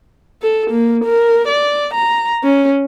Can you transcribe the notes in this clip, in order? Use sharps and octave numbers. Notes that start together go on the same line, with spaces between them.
A4
A#3
A#4
D5
A#5
C#4